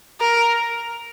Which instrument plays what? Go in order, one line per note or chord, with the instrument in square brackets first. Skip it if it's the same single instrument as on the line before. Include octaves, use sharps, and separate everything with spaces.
[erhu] A#4